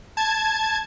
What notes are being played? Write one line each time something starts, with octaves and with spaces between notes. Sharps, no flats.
A5 G#6